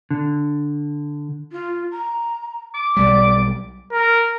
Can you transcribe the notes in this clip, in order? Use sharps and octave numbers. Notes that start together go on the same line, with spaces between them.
D3
F4
A#5
D6
B1 G3 D5
A#4